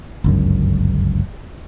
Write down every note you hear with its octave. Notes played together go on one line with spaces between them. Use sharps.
G1 C#2 F#2